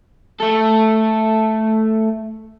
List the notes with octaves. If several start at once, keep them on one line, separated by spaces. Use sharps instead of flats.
A3 A4